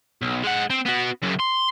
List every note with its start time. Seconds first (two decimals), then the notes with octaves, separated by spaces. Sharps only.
0.22 B1
0.43 G#3 F#5
0.70 C4
0.86 B3 F#4
1.23 F#2 C#3
1.40 C6